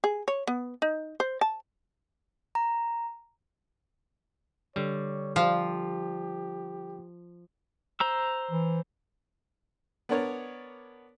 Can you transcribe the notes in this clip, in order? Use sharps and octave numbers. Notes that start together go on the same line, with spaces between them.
G#4
C#5
B3
D#4
C5
A5
A#5
D3 G3 C#5
F3 G4 F5
C5 A#5 E6
E3
B3 D4 A#4 C#5 D5